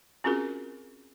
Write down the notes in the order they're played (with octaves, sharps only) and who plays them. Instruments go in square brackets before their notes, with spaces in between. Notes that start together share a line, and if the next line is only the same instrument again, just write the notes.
[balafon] C4 C#4 F4 F#4 G#4 A#4